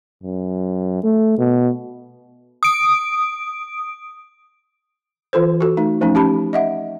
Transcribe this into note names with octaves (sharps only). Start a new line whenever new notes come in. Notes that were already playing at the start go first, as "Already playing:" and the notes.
F#2
A3
B2
D#6 D7
E3 F4 A4 C5
F#4 A4
A3 D#4
F3 A3 C#4 D#4
C#4 G4 A5 B5
D#5 E5 F#5